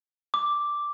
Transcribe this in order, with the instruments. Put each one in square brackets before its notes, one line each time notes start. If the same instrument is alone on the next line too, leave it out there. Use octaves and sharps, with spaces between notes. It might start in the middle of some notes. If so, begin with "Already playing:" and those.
[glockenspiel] D6